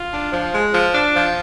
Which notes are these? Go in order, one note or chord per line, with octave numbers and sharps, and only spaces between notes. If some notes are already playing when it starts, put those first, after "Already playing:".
Already playing: F4
D4
F3
G#3
F3
D4
F3